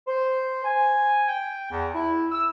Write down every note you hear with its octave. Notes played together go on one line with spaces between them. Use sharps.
C5
G#5
G5
E2
E4
E6